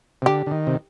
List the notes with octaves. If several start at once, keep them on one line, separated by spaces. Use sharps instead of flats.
C3
D3 G4
D3
D#3
C3